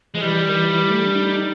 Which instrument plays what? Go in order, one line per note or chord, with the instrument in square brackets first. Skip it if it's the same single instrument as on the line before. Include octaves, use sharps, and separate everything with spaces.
[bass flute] F3 [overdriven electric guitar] G#3
[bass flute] E3 [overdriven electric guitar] G3
[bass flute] D#3
E3
E3
A3
D4
E4
D#4